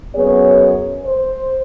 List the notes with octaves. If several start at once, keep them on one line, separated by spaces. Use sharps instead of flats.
F#2 B3 G#4 C#5
C5